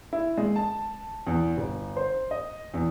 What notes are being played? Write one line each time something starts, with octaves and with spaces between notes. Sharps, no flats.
E4
G#3
A5
E2
G1
C5
D#5
E2